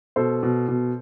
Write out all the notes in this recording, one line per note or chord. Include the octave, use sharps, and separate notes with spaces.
B2 A4 C5
B2
B2